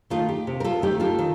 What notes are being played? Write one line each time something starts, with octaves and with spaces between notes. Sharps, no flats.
D#3 A3 D#4 F4
G4
C3
A#4
F4 A4
D#3 A3 D#4 G4
F4 A4
D#3